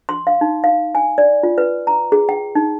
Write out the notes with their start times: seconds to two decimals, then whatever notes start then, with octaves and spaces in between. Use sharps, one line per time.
0.09 C6
0.27 F5
0.41 D#4
0.64 F5
0.95 G#5
1.18 D5
1.43 F4
1.58 B4
1.87 A#5
2.12 G#4
2.29 G5
2.55 D#4